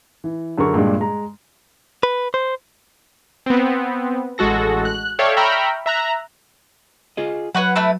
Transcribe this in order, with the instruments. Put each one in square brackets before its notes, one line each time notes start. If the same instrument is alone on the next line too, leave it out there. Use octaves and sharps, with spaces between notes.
[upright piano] E3
F#2 D3 G#4 A#4 C#6
G2 A#2 G3 G#3 D4
G#3 A#5
[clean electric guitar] B4
C5
[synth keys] B3 C4
A1 G#3 F#4 A4 A#6
F#6
A4 C#5 D5 E5 F5 G5
E5 G5 A#5 B5 C#6 F6
E5 A#5 F#6
[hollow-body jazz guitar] F4 G#4 D#5
[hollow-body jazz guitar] F#3 [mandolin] B4 C#5 F#5
[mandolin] A3 E4 B4